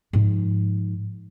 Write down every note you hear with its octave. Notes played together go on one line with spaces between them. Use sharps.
G#2 F3